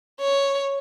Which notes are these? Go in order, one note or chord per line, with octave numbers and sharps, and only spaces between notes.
C#5